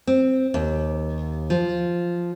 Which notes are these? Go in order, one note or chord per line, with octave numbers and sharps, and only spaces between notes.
C4
D#2
F3